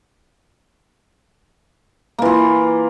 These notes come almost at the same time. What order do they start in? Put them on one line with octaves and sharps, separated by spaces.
A#3 E3 F4